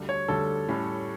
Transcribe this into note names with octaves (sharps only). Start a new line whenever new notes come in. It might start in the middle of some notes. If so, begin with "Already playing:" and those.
Already playing: D2 D3 G3
C#5
D2 D3 G3 A4
A2 G3 C#4